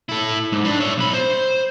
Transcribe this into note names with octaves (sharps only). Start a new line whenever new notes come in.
E4 A4
G#2
D4 B4
C#5 E5
B1 B5
C5